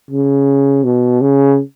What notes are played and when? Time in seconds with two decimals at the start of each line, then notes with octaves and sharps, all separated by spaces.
0.11 C#3
0.84 B2
1.21 C#3